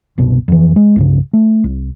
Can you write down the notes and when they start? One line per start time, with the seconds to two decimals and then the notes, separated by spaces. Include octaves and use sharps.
0.18 F#1 C2 B2
0.48 F2 E3
0.76 G#3
0.96 C2 G2 C#3
1.33 A3
1.64 C2